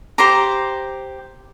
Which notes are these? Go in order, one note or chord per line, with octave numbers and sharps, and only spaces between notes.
G4 C5 A#5 D6